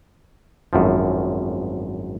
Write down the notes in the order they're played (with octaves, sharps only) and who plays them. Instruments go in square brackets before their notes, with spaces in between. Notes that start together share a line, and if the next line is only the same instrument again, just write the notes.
[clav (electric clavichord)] G#1 F#2 A2 F3